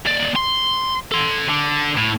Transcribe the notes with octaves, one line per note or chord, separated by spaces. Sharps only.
D#2 D5
C6
A4 C6
D3
A2